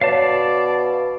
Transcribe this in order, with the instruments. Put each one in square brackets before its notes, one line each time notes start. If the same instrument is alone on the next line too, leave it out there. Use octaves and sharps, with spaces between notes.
[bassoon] B2 [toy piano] C#5 [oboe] D5 [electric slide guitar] F5 A5